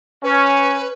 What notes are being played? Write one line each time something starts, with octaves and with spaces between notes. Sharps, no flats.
C#4 B4